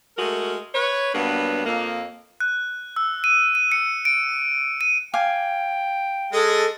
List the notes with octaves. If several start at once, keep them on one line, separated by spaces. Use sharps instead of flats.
G#3 A3 F#4 A#4
B4 C#5
G2 F#3 A#3 B3 D4
F2 A#3
F#6
E6
D#7
D#7
C#7
D7
D#7
F5 G5 G#5 D6
G#3 G#4 A4